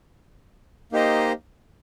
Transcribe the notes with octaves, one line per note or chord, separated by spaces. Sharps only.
A#3 D#4 G4 C5 D#5